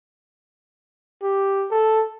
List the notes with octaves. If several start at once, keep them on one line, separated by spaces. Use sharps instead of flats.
G4
A4